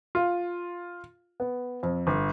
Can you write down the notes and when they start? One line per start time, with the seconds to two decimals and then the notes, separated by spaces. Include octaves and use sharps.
0.15 F4
1.40 B3
1.83 F2
2.07 G1